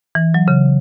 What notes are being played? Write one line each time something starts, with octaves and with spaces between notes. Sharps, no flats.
E3
F#3
C#3